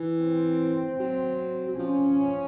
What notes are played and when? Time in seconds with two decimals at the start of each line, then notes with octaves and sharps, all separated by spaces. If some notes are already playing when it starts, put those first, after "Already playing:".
Already playing: E3
0.20 C4
1.00 F#3
1.68 F#3
1.78 F3 C#4